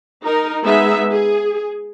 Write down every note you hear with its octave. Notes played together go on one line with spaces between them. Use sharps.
D#4 A#4
G#3 B3 D#4 G#4 E5
G#4